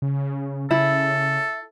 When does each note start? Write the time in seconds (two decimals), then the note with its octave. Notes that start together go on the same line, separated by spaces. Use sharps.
0.02 C#3
0.71 C#3 E4 A4